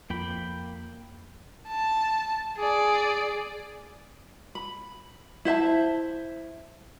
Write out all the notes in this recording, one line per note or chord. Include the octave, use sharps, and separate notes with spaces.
F2 A#3 G5 B5
A5
G#4 D5
B5
E4 C5 E5 A5